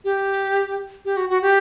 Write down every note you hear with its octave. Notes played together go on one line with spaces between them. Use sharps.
G4
G4
F#4
F#4
G4